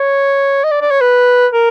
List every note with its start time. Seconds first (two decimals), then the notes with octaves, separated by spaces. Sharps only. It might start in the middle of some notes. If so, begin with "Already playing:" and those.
Already playing: C#5
0.64 D#5
0.71 D5
0.81 D5
0.91 C#5
1.01 B4
1.52 A#4